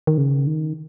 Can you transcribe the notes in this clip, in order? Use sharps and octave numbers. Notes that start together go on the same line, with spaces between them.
D#3
C#3
D#3